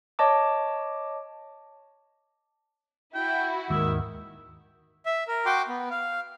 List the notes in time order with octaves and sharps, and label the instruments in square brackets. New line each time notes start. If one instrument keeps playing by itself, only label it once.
[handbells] C#5 D#5 A5 D6
[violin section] E4 F#4 [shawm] G5
[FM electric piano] D#2 G#2 [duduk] D#3 [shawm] E5
[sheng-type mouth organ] E5
A#4
F#4 G5 C6 D6
B3
F5